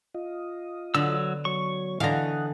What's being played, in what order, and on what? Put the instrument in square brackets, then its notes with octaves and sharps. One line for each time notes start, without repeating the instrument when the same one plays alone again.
[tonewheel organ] F4 D#5
[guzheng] D3 [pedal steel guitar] F#3 E6 [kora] B3
[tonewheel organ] F#3 C#5 [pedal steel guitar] C#6
[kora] D3 E3 [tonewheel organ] D#5 F#5 [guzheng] F5 A#5